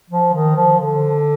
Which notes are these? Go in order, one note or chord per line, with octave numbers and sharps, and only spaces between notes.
F3
D#3
F3
D3